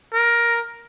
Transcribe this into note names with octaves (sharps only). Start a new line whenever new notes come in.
A#4